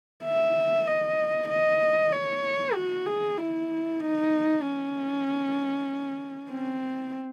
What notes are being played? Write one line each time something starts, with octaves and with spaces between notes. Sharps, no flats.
E5
D#5
D#5
C#5
F#4
G#4
E4
D#4
C#4
C4